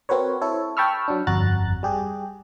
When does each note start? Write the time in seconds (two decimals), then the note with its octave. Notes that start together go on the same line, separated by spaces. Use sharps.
0.09 C4 F#4 A#4 B4 C#5
0.41 E4 A4 C#5
0.77 G5 A5 B5 C#6 E6 F6
1.08 F#3 D4
1.27 G1 F2 F#4 A#5 F#6 A6
1.83 G3 G4 G#4